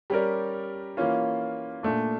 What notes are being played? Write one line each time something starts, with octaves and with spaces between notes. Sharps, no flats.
G3 C#4 G4 A#4 D5
E3 A#3 C#4 F4
A#2 A3 D4